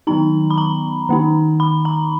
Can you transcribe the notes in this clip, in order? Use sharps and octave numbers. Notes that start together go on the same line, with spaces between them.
D#3 F#3 B3 D#4 A#5
B5
A#5
D#3 A#3 D#4
B5
A#5